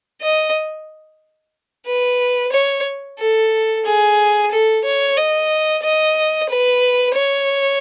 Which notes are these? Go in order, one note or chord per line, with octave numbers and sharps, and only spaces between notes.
D#5
B4
C#5
A4
G#4
A4
C#5
D#5
D#5
B4
C#5